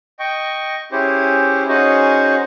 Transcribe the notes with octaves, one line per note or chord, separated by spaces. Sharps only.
D#5 G5 C#6
C#4 E4 G4 G#4 C5
C#4 D#4 F#4 G#4 C5 D#5